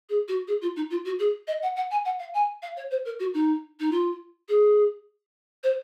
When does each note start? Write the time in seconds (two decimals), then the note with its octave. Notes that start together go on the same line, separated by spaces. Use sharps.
0.10 G#4
0.28 F#4
0.48 G#4
0.62 F4
0.76 D#4
0.90 F4
1.05 F#4
1.19 G#4
1.47 D#5
1.62 F#5
1.76 F#5
1.91 G#5
2.05 F#5
2.19 F5
2.34 G#5
2.62 F5
2.77 C#5
2.91 C5
3.05 A#4
3.20 F#4
3.34 D#4
3.80 D#4
3.92 F4
4.49 G#4
5.63 C5